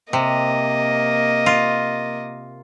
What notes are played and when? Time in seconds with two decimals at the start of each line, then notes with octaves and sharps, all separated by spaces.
0.13 C3 A#3 D#5
1.46 F4